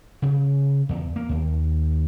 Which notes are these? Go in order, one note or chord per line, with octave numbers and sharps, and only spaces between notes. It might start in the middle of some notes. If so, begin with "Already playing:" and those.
C#3
E2
A#3
D#2